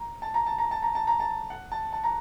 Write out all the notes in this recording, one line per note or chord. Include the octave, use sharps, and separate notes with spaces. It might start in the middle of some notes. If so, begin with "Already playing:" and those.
Already playing: A#5
A5
A#5
A5
A#5
A5
A#5
A5
A#5
A5
F#5
A5
A5
A#5